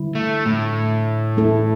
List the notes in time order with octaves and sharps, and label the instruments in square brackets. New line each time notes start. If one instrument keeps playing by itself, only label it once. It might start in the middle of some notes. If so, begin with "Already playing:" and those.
Already playing: [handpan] D3 G3 E4
[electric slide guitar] A3
A2
[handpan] A3 E4 A4